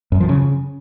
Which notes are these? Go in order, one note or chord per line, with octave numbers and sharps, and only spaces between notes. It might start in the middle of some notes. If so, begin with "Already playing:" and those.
F#2
F3
C#3